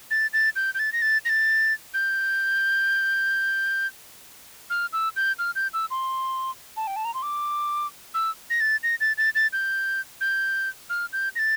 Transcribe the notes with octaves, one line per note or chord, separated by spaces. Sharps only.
A6
A6
G6
G6
A6
A#6
A6
A#6
A6
G6
F6
E6
G6
F6
G6
E6
C6
A5
G5
A5
A#5
C6
D6
E6
A#6
A6
A#6
A6
A6
A6
G6
G6
F6
G6
A#6
A6